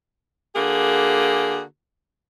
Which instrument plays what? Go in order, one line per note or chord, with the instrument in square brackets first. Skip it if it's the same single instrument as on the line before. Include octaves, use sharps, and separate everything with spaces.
[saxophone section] D3 A#3 F#4 G#4